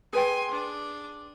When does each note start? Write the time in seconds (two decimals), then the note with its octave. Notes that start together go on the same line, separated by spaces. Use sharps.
0.13 G#4 B4 G5 G#5 C6
0.51 D4